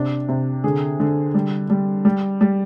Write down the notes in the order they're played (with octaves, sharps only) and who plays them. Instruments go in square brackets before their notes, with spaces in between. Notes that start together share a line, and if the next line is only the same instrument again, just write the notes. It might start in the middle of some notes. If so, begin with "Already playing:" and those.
Already playing: [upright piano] C3 D4
C3
D3 G#4
D3
G3
G3
G3
G3